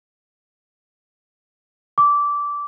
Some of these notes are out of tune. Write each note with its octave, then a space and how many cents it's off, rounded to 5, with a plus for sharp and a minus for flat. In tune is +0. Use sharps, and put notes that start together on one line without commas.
D6 -15